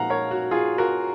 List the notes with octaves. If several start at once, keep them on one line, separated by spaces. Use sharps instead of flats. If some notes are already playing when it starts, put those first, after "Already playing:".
Already playing: A#2 F3 G#3 D#4 F5 F#5 A#5
A#4 C#5
F#4
F4 G#4
F#4 A#4